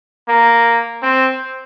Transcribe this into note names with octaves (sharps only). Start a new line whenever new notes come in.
A#3
C4